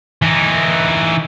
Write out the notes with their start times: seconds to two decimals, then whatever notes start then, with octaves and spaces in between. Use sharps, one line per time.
0.22 E3 D#4